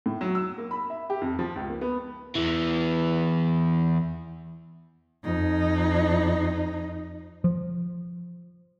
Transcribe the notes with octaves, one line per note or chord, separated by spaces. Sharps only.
A2
F#3
E6
A#3
B5
E5
G4
F2
F3
C#2
A#3
B3
E2 E3
F2 D#4
F3